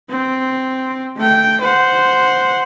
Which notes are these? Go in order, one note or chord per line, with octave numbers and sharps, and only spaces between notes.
C4
A3 G5
C5 F#5